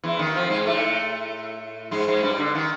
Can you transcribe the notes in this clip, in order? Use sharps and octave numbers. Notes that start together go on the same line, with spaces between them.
E2 E3
D#2 D#3
F2 F3
G#2 G#3
A2 A3
G#2 G#3
G#2 G#3
G2 G3
D3
D#3